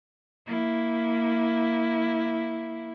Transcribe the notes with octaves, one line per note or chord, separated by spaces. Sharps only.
A#3 E4